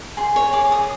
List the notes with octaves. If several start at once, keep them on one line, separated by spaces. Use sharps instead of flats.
G#4 C6
C#5
G#4 D6
C#5 D#6